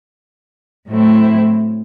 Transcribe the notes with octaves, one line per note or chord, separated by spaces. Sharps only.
A2 F#3 A3 C4 E4